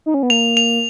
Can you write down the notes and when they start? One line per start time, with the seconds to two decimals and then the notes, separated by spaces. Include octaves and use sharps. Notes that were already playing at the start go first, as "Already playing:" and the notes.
0.06 D#4
0.14 C#4
0.23 B3
0.30 A#3 F7
0.57 F7